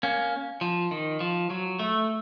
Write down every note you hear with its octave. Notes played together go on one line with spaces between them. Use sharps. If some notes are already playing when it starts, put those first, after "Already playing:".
A#3 C#4
F3
D#3
F3
F#3
A3